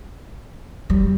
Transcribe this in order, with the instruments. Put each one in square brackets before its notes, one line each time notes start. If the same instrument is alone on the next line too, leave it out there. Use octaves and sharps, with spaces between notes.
[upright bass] G3